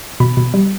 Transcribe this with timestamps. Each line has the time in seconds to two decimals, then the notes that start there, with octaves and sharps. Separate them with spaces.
0.20 B2 B5
0.37 B2
0.54 G3